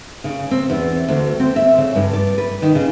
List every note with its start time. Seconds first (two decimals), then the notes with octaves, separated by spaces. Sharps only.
0.24 C#3
0.51 C4
0.70 E2
1.08 D2
1.40 C4
1.56 E5
1.78 C#3
1.95 G2
2.13 D5
2.38 B4
2.62 D#3
2.75 C#3